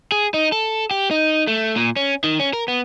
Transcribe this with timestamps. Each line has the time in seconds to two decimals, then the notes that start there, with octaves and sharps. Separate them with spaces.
0.12 G#4
0.34 D#4
0.52 A4
0.91 G4
1.11 D#4
1.47 A3
1.76 A#2
1.96 C#4
2.24 D#3
2.40 C#4
2.53 A#4
2.68 B3